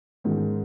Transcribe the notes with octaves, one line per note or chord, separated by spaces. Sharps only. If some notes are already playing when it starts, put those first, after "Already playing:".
G#2 D#3 G#3 C#4 F4